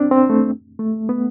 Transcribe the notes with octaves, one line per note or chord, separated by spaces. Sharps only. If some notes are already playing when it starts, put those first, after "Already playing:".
Already playing: C4 D4
C4
A3
A3
B3